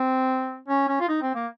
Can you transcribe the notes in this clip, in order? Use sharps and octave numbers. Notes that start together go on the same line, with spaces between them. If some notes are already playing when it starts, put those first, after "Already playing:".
Already playing: C4
C#4
C#4
F4
D#4
C4
A#3